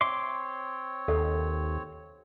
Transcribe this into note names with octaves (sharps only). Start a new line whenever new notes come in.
C4 C#5 E5 C6 D6
D#2 A4 E5 F#5